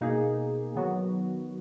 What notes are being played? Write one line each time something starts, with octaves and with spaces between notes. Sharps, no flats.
B2 A#3 D#4 G#4
D#3 F#3 B3 F#4